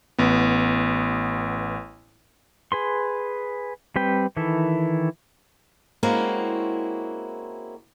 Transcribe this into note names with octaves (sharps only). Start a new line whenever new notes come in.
A1 B3
G#4 B4 C6
G3 C4 B4 G5
D#3 E3 E4 A4
G#3 A#3 C4 C#4 E4 F#4